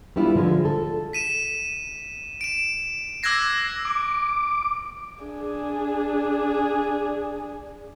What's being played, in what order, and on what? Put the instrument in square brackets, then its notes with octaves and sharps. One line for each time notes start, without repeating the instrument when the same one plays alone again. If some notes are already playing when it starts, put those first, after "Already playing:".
[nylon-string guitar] G3 B3 D4 E4 F4
D3 F3 G#3 F4
A4
[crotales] B6 D#7 E7
D7 E7
D6 E6 F#6 G#6 A#6 C7
[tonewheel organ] D6
[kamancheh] D4 G#4